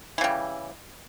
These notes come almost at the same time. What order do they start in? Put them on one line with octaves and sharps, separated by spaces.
E3 C#3 G3